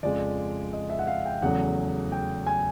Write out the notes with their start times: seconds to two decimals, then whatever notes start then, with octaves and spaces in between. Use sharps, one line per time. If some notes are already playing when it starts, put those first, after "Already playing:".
0.03 F2 C#3 F3 G#3 D5
0.73 D#5
0.90 E5
0.99 F#5
1.07 F5
1.26 G5
1.42 E2 C#3 F#3 A3 F#5
2.12 G5
2.47 G#5